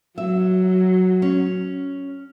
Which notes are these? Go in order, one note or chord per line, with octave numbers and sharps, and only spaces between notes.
F#3 E5
C#4